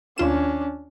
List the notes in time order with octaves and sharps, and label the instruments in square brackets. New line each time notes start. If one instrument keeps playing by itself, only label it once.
[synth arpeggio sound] D#2 F4 E7 [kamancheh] C#4 D4